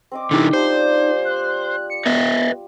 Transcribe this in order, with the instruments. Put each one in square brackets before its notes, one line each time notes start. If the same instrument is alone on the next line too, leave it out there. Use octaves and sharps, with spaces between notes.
[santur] C4 D#5 D6
[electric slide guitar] D3 E4 [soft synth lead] D#4 [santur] G4 D#5
[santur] G3 D4 F4 [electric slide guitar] C5
[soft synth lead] F#6
C#7
[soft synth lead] B3 [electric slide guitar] B4 D#5 E5